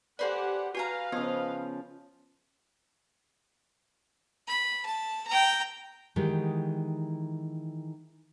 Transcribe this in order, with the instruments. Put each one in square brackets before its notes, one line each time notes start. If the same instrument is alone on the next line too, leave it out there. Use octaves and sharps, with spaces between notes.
[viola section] G4 F#5 [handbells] A4 D5 [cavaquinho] B4 C5 G#5
[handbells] F#4 [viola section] B4 F5 [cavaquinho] C#5 G#5 A#5
[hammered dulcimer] C#3 F3 [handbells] B3 [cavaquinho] D#5
[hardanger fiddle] B5
A5
G5 A#5
[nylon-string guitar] D#3 E3 G#3 D#4 F#4 G4